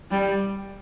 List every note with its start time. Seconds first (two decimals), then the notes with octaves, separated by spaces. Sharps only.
0.11 G3